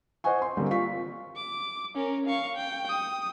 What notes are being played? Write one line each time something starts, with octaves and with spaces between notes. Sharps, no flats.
C5 D#5 F#5 G#5 C#6
C6
D3 G3 A#3 C4
F4 F5 C#6 B6
D6
C#4 A#4
F5 C#6
G5
D#6